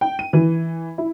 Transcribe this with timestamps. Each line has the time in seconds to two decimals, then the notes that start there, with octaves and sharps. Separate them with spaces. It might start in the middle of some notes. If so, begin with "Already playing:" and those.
0.01 G5
0.19 D#7
0.33 E3
0.98 E4